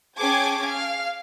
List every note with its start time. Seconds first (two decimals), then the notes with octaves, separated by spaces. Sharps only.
0.17 C#4 G#4 G5 A5 D6 G#6
0.66 F5